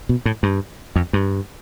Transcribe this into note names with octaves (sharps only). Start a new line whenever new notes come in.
B2
A2
G2
F2
G2